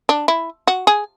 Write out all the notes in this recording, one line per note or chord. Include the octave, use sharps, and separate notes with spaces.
D4
E4
F#4
G#4